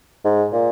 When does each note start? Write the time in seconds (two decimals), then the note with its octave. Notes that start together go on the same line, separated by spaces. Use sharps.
0.25 G#2
0.52 A#2